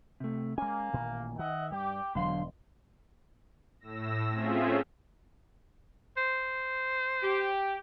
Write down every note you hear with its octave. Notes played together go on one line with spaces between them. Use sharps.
C3 A3
G#3 A#3 C#4 G#5
A1 A#2 D#3
D#3 D#5 E5 F#5
G2 G3 G4
E1 D3 F#3 F5 C6
A2 E6 A#6
A3 C4 C#4 F4 G#4 E5
C5
G4